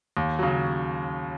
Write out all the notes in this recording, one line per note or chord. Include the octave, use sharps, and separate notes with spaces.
D#2
C#3 F#3